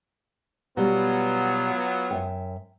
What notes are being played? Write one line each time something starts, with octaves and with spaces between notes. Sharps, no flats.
B2 F#3 G3 B3 F4
F#2 E5 G5